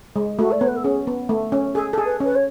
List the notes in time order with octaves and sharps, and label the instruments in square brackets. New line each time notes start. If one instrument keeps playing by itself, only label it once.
[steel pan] G#3
[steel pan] A3 [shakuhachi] F#4
[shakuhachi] D5
[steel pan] B3 [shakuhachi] C#5
[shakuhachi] B4
A4
[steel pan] C#4 [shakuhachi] G#4
[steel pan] B3
A3
C#4
[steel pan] G#4 [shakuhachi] A4
[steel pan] A4
G#4
[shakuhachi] B4
[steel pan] C#4
[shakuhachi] B4
C#5